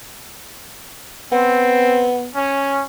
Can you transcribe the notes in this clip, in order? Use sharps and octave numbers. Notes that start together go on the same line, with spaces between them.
B3 C4
C#4